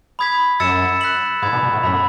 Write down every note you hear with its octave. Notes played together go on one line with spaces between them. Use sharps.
B5 D#6 G#6 B6
F#2 E6 A6 C#7 E7
F#6 B6 F#7
G#2 B5 D#6 G#6
B2
B2
A2
F#2 B5 E6 B6 F#7